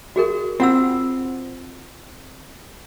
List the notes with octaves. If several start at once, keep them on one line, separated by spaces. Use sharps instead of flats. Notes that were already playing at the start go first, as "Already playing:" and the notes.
F#4 G#4 A#4
C4 F4 F#5 E6